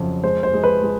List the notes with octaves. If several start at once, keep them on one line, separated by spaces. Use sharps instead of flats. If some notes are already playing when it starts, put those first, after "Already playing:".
Already playing: F2 C#3 F#3
G#3 C5
C5
G#3
B4
G#3